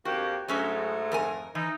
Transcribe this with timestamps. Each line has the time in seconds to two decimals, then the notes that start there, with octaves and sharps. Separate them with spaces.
0.05 F2 A#3 F#4 G4
0.48 G#2 F#3 G#3 A3 C#4 F#4
1.12 F2 A#4 G#5
1.55 E3 D#4